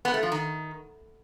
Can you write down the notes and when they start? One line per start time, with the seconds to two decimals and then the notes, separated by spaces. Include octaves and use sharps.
0.05 B3
0.14 A3
0.23 F3
0.32 D#3